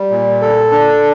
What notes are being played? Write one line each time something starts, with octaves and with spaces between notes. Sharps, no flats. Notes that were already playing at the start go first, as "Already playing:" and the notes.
Already playing: G3
A#2
A4
D4